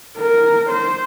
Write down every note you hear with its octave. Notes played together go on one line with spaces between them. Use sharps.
A#4
C5